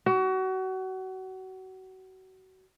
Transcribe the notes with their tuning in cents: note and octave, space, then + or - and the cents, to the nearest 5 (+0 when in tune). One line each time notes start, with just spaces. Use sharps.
F#4 +30